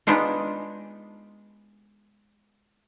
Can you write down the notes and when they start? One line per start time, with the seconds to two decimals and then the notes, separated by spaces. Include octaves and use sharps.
0.07 G#3 B3 D4 D#4 F4